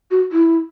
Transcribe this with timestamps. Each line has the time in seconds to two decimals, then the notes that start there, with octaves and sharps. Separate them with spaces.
0.11 F#4
0.32 E4